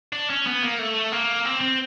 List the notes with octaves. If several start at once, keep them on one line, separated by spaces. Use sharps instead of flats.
D4
C#4
B3
A#3
A3
A#3
C4
C4